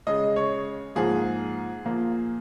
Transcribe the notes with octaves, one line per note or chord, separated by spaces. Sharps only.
C#3 G#3 D#5
C#5
G#2 F3 A#3 G#4
A#2 F3 A#3